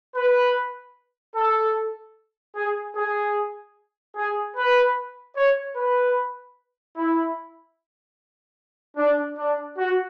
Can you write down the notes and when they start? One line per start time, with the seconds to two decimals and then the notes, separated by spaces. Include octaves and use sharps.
0.16 B4
1.36 A4
2.56 G#4
2.96 G#4
4.16 G#4
4.57 B4
5.37 C#5
5.76 B4
6.97 E4
8.97 D4
9.38 D4
9.78 F#4